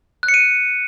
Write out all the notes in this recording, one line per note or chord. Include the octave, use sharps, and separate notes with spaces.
F#6
C#7
D#7